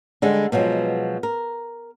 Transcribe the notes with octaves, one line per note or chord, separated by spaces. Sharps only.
D3 G3 G#3
B2 F3 F#3 G#3
A#4